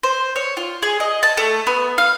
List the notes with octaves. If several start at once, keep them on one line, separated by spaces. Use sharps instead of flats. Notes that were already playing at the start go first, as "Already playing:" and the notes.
C5
C#5
F4
G#4
D#5
A5
A3
B3
F5